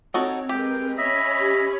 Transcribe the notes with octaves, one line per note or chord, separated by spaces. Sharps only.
C4 D#4 F#4 A4 C#5
G#3 G4 A#4 B4 G5
C#4 C#5 D#5 E5 B5
G4